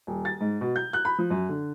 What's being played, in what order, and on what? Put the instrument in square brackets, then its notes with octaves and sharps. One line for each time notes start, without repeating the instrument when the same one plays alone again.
[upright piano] D#1
A6
G#2
B2
G6
F#6
B5
F3
F#2
D3